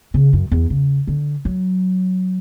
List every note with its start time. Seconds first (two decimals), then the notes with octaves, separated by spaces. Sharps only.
0.14 C#3
0.33 F#2
0.52 E2
0.70 C#3
1.07 D3
1.45 F#3